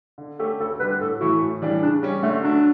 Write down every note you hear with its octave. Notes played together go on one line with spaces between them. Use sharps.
D3
A3 C#4 G4 A4
D2 A4
D3 G3 B4
A2 A4
E3 A3 E4 F#4
A2
E3 G3 D4
C#3 D4
G3 C#4
D3 A3
F#3 A3 D4